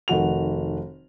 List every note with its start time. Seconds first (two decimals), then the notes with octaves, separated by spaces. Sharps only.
0.08 F1 D#3 F#4 F7